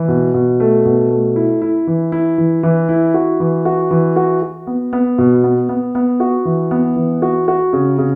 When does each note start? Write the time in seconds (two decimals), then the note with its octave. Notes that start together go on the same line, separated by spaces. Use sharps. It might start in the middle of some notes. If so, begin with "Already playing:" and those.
Already playing: E3
0.08 B2
0.34 B2
0.60 A3
0.85 B2
1.10 A3
1.36 E4
1.62 E4
1.87 E3
2.12 E4
2.38 E3
2.63 E3
2.89 E4
3.14 F#4
3.40 E3
3.65 F#4
3.91 E3
4.16 F#4
4.42 F#4
4.67 B3
4.93 B3
5.18 B2
5.44 B3
5.69 B3
5.95 B3
6.20 F#4
6.45 E3
6.71 B3
6.96 E3
7.22 F#4
7.48 F#4
7.73 C#3
7.98 C#3